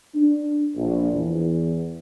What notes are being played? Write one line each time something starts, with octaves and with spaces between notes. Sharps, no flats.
D4
A#1
E2